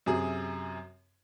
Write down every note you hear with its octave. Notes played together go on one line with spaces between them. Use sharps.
F#2 C3 G#4